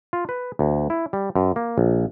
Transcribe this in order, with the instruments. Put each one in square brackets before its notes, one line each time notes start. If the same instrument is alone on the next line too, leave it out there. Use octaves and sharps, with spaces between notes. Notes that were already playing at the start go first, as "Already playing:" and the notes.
[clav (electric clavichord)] F4
B4
D2
E4
G3
F#2
A#3
A#1